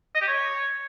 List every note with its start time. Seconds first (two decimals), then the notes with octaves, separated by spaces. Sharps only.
0.15 D#5
0.21 G4
0.27 C#5